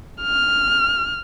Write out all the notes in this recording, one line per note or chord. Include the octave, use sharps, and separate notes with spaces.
F6